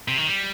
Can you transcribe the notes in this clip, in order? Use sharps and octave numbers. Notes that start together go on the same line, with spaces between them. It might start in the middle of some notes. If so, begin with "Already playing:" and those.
C3
D#3
G3